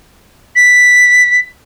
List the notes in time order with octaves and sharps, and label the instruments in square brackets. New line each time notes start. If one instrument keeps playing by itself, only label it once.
[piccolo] B6